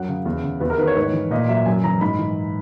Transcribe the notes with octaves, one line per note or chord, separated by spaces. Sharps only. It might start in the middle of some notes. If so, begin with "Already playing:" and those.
Already playing: F#2 F#3 F#5
C#3
E2
C#3
E2 B4
A#4
D#3 B4
C#5
G#2 B4
C#5
E3
A#2 D#5
F#3 E5
F#2 G#5
E3 A#5
G#2 B5
E3